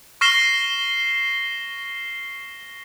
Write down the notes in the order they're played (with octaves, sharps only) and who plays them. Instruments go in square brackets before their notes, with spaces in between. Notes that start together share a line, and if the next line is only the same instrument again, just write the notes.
[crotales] C#6 F6 A#6 C7 E7 G7